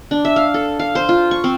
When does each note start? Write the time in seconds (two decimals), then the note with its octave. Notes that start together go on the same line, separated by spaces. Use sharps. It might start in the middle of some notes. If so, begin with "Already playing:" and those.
0.11 D4
0.25 E5
0.36 F5
0.54 A4
0.79 F5
0.95 C5
1.09 F4
1.31 C#6
1.44 C4